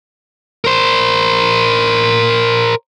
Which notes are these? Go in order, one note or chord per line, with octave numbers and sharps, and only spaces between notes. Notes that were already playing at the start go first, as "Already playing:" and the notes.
A#4 C5